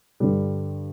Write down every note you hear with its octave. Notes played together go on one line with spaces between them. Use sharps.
G2 D3 G3